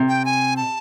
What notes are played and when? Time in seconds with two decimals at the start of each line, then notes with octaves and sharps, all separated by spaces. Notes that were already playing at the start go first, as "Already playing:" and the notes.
Already playing: C3
0.08 G5
0.25 G#5
0.57 A5